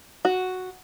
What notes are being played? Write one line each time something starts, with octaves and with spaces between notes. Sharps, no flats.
F#4